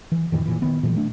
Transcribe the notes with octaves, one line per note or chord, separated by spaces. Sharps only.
E3
F2 A2 D#3 E3
F1 A#2 E3
D#3 B3
A#2 E3 F#3
A3 D4